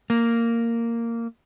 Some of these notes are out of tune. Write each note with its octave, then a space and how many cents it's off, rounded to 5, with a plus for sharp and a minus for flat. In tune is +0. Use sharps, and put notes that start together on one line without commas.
A#3 -10